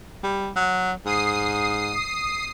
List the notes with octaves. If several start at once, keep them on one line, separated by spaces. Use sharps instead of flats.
G3
F#3
G#2 D#6 C7